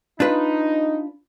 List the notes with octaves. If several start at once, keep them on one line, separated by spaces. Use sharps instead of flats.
D4 D#4 F4 B4